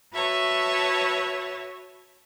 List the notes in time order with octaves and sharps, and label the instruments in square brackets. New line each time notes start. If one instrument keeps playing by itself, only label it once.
[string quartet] F#4 B4 C#5 E5 A5